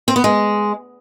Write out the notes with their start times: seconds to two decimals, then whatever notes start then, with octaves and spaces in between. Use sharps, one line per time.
0.08 C4
0.16 B3
0.24 G#3